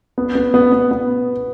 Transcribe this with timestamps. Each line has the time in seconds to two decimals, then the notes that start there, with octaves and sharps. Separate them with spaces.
0.18 B3
0.35 B3
0.54 B3
0.72 B3
0.91 B3